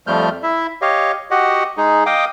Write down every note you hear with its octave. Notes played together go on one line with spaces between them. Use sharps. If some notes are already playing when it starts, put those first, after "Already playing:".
F2 F3 G3 A3 F6 G6
E4 E5
G4 C#5 D#5 F5
F#4 G4 D#5 F#5
G#3 D#4 G#4
D#5 F5 G5 D6 D#6